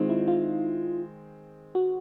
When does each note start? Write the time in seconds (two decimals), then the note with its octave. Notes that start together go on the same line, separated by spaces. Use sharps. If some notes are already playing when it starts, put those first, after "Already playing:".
Already playing: D#3 G#3 C4 D#4 F4
0.09 E4
0.28 F4
1.75 F#4